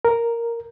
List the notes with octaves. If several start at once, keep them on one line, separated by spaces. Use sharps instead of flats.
A#4